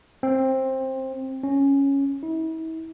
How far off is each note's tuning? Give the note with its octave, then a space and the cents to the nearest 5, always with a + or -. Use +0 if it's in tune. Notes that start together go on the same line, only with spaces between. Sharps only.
C4 +15
C#4 +0
E4 -40